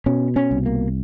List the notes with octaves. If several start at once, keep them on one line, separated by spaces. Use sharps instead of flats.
B2 C#4
C#4
C2
A#3